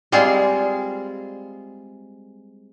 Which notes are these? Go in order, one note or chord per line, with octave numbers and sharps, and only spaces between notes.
G3 G#3 C4 F4 G#4